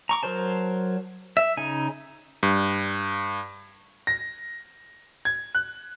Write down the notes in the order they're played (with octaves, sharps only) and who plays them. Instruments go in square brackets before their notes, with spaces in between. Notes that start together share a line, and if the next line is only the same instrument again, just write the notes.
[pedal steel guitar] A#5 C#6 D6
F#3 A#4 C5 A5
E5
C#3 D#4 G#5
[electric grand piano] G2
[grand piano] A#6
G#6
F#6